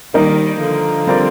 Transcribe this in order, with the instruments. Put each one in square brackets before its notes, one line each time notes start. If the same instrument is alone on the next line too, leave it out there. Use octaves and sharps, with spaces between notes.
[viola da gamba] D#3 G3 [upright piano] A#3 D#4 A#4
[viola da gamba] D3 F3
[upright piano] G3 C4 F4 A#4 D5